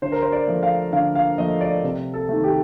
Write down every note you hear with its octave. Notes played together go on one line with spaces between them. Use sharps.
D3 C5
A#4
C5
D5
F3 A3
F5
D3 F5
F5
F3 A3 D#5
D5
C3
A4
D#3 A3
G4